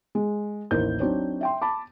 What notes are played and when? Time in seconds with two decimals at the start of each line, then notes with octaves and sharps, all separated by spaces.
0.15 G#3
0.71 A1 D#2 E4 A#4 C5 G6
1.00 F#3 C4 D4 D#4 C5 C#5
1.41 E5 G5 C6
1.62 A5 B5 D6